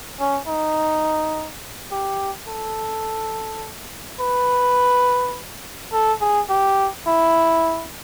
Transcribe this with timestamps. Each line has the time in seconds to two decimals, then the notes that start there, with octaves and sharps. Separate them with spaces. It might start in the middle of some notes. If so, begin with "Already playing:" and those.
0.19 C#4
0.47 D#4
1.91 G4
2.48 A4
4.20 B4
5.93 A4
6.21 G#4
6.49 G4
7.07 E4